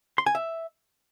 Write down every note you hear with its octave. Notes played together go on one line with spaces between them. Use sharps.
C6
G#5
E5